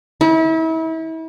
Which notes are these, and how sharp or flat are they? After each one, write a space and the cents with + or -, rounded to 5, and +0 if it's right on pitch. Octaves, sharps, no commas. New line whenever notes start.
E4 -35